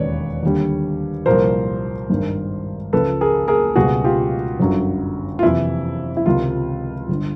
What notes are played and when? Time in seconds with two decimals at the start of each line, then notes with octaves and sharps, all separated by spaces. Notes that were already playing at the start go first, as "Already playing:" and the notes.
Already playing: E1 D#2 C#3 B4 C#5 D5
0.43 D#2 D3 G3
1.26 C2 A#2 F3 A#4 C5
2.10 G#1 G2 D#3
2.93 C#2 C#3 F3 A4 B4
3.21 G#4 A#4
3.48 G#4 A#4
3.76 C#2 B2 G3 F#4 G#4
4.04 F4 G4
4.60 G1 F#2 D3 F#3
5.39 F4
5.43 F2 C3 E3 E4
6.17 E4
6.26 C#2 C3 D#3 F4
7.09 G1 D3